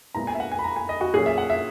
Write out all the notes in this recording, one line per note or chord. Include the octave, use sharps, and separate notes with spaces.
A#2 G#3 B3 E4 A#5
G#5
E5
F#5
G#5
B5
A#5
G#5
D#5
F#4
A#2 F#3 C#4 G#4
E5
F#5
E5